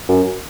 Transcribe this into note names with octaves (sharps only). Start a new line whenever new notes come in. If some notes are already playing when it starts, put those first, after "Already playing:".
F#2